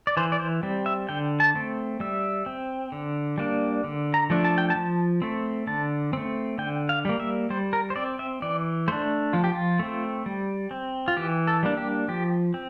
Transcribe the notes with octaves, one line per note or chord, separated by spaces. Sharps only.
D5
E3 C5
D5
C5
G3 C4
E5
D3 G5
A5
A3 C4
G3 E5
C4
D3
G3 A#3 D4
D3
A#5
F3 A3 D4
A5
G5
A5
F3
A3 C4
D3 A5
A3 C4
D3 G5
F5
G3 A#3
E5
G3 C5
A#4
C5
C4 D5
E5
E3 D5
A3 D4 C5
F3 F4
G4
F4
A3 C4
G3
C4
F4
E3 G4
A4
G3 A#3 D4
G4
F3 G4
C4